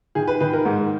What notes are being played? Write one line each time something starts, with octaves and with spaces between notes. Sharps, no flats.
D#3 G#4
B4
D#3 B4
A#4
G#2